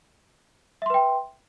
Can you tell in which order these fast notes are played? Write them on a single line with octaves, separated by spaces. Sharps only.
E5 C6 B4 G5